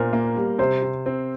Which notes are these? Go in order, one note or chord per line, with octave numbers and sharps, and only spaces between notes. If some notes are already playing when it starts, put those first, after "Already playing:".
Already playing: A#2 A#4 C5
A#3
G3
C3 C5
C3
C4